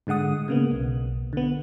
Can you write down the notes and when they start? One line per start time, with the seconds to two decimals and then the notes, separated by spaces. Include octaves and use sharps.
0.07 G#2 D3 G#3 F#5 D#6
0.48 C#3 A#3 B3
0.71 B1
1.33 D3 B3